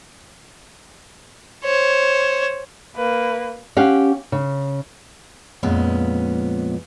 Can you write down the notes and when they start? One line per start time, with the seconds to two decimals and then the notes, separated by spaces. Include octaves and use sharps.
1.64 C5 C#5
2.96 A#3 B4
3.77 C#4 G4 F5 F#5
4.32 C#3
5.63 F2 A#2 G#3 B3 C#4